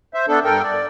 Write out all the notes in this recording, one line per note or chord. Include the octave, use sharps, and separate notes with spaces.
C5 E5
B3 D4 A4
G2 A4 A#4 G5
D5